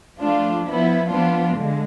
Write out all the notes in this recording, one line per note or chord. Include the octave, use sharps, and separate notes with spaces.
F3 A3 D4 F4
F3 B3 E4
F3 B3 D4 F4
D3 G#3